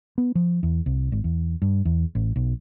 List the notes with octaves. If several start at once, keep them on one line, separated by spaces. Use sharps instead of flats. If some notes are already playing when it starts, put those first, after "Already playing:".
B3
F3
E2
C2
G#1
E2
G2
E2
A1
B1